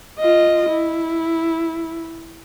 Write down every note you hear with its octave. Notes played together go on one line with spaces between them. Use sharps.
F4 D#5
E4